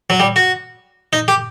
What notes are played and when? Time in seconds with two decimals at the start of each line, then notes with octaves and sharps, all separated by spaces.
0.10 F#3
0.20 G3
0.36 F#4
1.13 D#4
1.28 G4